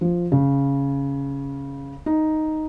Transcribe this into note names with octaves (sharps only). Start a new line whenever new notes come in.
F3
C#3
D#4